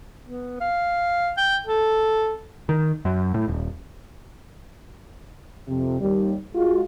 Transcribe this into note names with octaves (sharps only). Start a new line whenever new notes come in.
B3
F5
G5
A4
D#3
F#2
A2
D#1
F2 C3
D#2 G3
G#3 F4 F#4